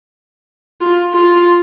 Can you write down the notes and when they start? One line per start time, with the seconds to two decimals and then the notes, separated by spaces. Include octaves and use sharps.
0.81 F4
1.13 F4